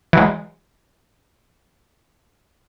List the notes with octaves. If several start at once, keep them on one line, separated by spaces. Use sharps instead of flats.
E3 F#3 G#3